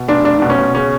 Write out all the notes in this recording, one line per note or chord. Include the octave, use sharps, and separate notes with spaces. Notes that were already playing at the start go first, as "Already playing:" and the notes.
Already playing: B2
F1 D4
F1 D4
B2 D4
C#4
B2
C#3 C#4